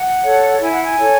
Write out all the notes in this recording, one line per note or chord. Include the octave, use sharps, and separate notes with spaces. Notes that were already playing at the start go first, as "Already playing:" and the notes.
Already playing: F#5
A4 C#5
E4 G#5
F#5
G#5
A4 C#5